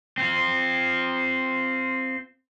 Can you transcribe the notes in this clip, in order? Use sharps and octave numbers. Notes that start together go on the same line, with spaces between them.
C4 F4